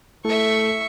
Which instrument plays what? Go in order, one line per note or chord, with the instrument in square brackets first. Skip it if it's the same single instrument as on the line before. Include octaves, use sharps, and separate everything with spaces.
[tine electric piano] A3 E4 A4 [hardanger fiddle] E5 C#6